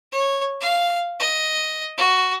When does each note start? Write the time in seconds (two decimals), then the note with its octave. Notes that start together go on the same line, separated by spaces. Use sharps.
0.12 C#5
0.61 F5
1.19 D#5
1.97 F#4